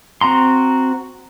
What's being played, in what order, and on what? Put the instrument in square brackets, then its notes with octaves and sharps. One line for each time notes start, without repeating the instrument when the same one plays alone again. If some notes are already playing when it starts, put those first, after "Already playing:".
[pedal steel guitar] C4 F#4 A#5 C6